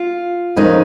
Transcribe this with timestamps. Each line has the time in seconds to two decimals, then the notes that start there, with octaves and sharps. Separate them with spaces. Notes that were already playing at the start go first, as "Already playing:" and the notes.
Already playing: F4
0.56 F2 D#3 G#3 C#4 D#4